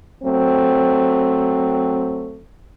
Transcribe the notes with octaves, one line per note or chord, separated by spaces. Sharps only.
F#3 A3 C4